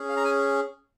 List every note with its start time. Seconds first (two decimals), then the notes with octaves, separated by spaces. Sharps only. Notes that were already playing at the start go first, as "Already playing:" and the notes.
Already playing: C#4 G#4
0.09 F5
0.17 A#5
0.25 G#5